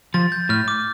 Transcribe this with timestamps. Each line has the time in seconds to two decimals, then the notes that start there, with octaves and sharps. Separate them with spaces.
0.14 F3 A6
0.32 G6
0.49 A2 F6
0.68 D6